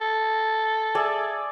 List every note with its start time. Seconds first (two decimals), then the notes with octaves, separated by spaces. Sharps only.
0.01 A4
0.95 G#4 D5 E5